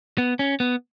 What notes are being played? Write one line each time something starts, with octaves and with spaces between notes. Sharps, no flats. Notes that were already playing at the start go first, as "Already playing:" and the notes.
B3
C#4
B3